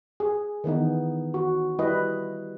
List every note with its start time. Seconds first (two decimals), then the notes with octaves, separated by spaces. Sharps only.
0.20 G#4
0.64 D#3 E3 B3 D#4
1.34 F#4
1.79 G3 E4 B4 D#5